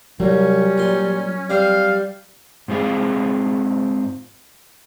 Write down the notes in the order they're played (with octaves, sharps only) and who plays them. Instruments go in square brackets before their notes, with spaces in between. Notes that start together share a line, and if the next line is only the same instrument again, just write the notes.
[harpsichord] C2 [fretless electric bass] F#3 [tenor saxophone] G3 [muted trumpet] C#4
[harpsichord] A#2 C6
[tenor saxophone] G3 [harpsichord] C4 [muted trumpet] F5
[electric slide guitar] G#2 C4 F4 G#4 F5